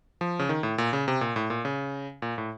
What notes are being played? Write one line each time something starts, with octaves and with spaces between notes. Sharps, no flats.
F3
C#3
D#3
A2
A#2
C#3
C3
A#2
A2
A#2
C#3
A#2
A2